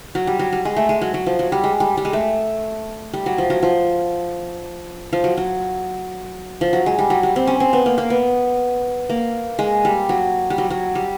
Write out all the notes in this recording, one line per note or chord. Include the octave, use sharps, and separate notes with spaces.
F#3
G3
F#3
G3
G#3
A3
G#3
F#3
F#3
F3
F#3
G3
G#3
G3
G3
G#3
A3
G3
F#3
F3
F#3
F3
F3
F#3
F#3
F3
F#3
G#3
G3
F#3
G3
C4
C#4
C4
B3
A#3
A#3
B3
A#3
G#3
G3
F#3
G3
F#3
F#3
G3